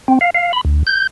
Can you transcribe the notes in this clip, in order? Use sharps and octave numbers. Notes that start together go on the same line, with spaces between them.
C4
F5
F5
B5
D2
G6